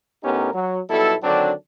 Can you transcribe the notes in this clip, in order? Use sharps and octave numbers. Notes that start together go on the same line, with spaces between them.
A2 B3 C#4 D#4 G4 A#4
F#3
B1 B2 G3 E4 A4
D3 D#3 F#3 C4 D4